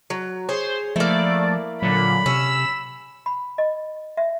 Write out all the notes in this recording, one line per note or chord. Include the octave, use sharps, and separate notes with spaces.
F#3
G#4 C5 C#5
F3 A3 A#3 E4 D5
A#2 D3 F#3 B5
C3 C#4 E6 E7
B5
D#5
E5